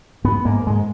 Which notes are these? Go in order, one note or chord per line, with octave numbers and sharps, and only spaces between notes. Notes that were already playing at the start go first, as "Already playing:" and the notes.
G#2 B3
G#2 A#3
G#2 G#3